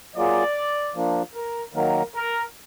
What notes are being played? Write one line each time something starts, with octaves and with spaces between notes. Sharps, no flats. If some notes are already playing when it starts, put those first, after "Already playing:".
F#3 A#3 F4 G#4 D5
F3 A#3 D4
A#4
D#3 F#3 A#3 A#4
A#4